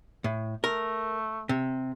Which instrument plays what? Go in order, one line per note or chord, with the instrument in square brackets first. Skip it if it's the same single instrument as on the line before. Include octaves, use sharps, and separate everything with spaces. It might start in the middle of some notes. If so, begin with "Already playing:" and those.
[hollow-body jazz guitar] A2
[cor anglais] A3 [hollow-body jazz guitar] A#4
[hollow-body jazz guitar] C3